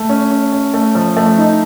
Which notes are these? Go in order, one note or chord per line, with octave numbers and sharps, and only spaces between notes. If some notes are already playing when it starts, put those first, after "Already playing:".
Already playing: A3
C#4
C#4
C#4
A3
F3
A3
D#4